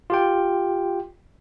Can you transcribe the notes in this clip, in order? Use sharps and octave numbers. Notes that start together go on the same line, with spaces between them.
F4 G4 G5